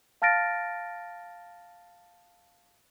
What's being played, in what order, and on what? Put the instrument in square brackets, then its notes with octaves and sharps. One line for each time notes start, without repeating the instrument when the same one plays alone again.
[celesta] F5 A5 F6 A6 A#6 D7